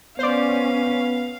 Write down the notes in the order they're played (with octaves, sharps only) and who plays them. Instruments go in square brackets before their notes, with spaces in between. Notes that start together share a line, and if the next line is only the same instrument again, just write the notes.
[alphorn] B3 [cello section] C#4 [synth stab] C5 D5 [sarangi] F5